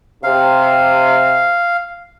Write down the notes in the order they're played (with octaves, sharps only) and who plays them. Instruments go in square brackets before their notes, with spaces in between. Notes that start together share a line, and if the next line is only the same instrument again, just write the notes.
[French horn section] C3 [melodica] F5